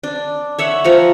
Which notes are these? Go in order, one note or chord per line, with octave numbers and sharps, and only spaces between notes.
D4
C#5 E5 F#5
F3 C#5 A#5